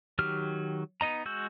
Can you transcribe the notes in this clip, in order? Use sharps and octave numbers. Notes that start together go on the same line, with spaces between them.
D#3 F#3 G4 F6
B3 D#4 D#5 A#5
G#3 F#4 E6 G6